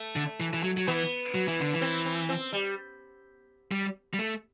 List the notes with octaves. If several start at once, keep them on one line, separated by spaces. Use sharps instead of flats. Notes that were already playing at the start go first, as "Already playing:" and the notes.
Already playing: A3
D3
E3
E3
F#3
F#3
E3 B3
F#3
E3
D3
E3
C4
C4
C4
G3
G3
G3
A3